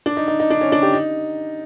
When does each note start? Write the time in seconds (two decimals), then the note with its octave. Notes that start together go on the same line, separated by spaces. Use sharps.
0.06 D4
0.17 D#4
0.28 D#4
0.40 D#4
0.50 D4
0.61 C#4
0.72 D4
0.82 G4
0.93 D#4